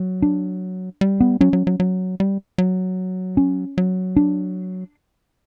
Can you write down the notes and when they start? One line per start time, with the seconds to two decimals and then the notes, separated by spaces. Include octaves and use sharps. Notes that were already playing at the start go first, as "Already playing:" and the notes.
Already playing: F#3
0.22 D4
1.01 G3
1.21 B3
1.41 F#3 C#4
1.53 F#3
1.67 F#3
1.80 F#3
2.20 G3
2.58 F#3
3.37 C#4
3.78 F#3
4.17 D4